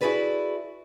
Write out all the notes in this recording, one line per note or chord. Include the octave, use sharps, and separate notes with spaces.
E4 F#4 G#4 A4 B4 D5